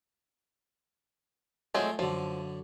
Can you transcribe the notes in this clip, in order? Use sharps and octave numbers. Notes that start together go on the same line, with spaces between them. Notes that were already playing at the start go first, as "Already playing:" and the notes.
F#3 G#3 A3 C4 F4
F#2 D3 F3